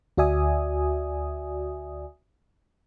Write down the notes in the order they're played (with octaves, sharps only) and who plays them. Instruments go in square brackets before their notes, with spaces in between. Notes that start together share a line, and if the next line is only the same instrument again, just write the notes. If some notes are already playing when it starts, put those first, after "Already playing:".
[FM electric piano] D2 F#4 D5 E5 G#5 D#6